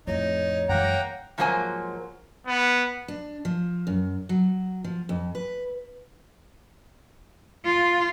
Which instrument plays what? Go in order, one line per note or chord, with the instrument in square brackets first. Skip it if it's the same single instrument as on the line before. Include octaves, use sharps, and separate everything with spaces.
[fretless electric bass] F2 A2 [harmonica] D#4 [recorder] C#5
[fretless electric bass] F#2 E3 G#3 [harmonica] A#3 A#5 [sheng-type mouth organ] F#5 G5
[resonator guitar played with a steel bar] G#2 F3 F#3 A#3 C5 G#5
[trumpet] B3
[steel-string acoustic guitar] D4
F3
F#2
F#3
F3
F2
B4
[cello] F4